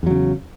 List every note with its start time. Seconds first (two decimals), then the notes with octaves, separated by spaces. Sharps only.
0.03 E2
0.07 F#3
0.10 C#3